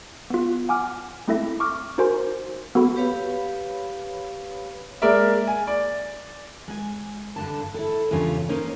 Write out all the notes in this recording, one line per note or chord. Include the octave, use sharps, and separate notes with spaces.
B3 F4
F#5 G#5 D6 F6
A3 C4 E4 A4 E5 A#6
C#6 D6 F6
D#4 F#4 A#4 C5 G#5 C6
B3 F#4 A4 B5
G4 B4 C#5 F5 B5
G#3 A#3 A#4 D5 E5
G#5
D5
G#3 G#5
G2 D3 A5
E4 A4
E2 G2 C#3 F4 C#5
A#3 C#4 D#4 C5 C#5